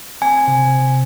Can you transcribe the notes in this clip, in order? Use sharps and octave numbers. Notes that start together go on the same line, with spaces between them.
C4 G#5
C3